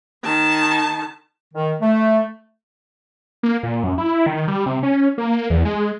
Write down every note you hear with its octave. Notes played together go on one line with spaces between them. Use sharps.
D#3 A5
D#3
A3
A#3
A#2
F#2
E4
D#3
G3
C3
C#4
A#3
E2
G#3